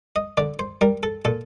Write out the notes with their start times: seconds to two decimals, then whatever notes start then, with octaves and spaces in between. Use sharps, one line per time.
0.16 D#5
0.37 D3 D5
0.59 C5
0.81 G3 A#4
1.03 A4
1.25 A#2 A4